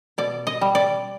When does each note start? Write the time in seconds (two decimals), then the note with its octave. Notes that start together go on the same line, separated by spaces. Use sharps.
0.18 B2 D5
0.47 D#5
0.61 G3
0.75 D5